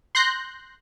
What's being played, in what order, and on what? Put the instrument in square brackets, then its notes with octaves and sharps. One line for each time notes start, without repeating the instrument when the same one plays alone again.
[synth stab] C6 F#6 G6 A#6 C7